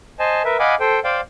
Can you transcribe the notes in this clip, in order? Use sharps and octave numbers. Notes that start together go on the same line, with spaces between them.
C5 D#5 G#5 A5
A#4 B4 E5
D#5 F5 F#5 G#5 B5 D6
A4 C5 G5
C5 D5 F5 G5